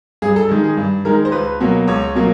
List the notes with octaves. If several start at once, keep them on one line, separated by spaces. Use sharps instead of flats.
G2 G#4
A4
D#3 G#3
G#4
G2
D#3 G#3 A#4
C5
C#2 B4
B2 F#3 A#3
C#2 C#5
B2 F#3 A#3